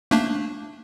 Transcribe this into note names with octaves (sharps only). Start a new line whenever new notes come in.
A3 A#3 D4